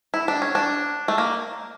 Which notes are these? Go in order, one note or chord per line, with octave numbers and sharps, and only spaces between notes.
E4
D4
C#4
D4
A3
A#3